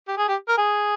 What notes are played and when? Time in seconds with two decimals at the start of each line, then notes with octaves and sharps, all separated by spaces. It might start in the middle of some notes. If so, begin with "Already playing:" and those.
0.08 G4
0.18 G#4
0.28 G4
0.48 A#4
0.58 G#4